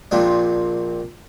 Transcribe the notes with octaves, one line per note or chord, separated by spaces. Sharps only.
A#1 A#2 C4 D4